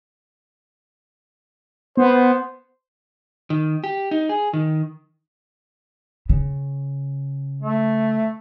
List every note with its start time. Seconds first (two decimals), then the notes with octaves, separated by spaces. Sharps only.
1.97 B3 C5
3.50 D#3
3.84 G4
4.11 D#4
4.29 G#4
4.53 D#3
6.29 C#3
7.62 A3